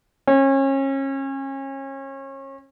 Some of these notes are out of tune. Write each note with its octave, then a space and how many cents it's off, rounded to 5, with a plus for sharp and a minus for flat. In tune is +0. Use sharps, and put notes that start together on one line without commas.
C#4 -30